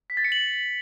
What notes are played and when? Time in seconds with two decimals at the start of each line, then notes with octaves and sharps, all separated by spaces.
0.10 B6
0.17 A6
0.25 C#7
0.32 F#7